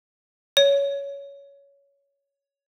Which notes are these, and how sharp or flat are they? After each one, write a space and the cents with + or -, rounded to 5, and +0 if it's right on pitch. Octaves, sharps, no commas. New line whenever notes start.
C#5 +15